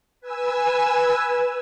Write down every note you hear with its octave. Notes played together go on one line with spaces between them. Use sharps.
B4 G#5 E6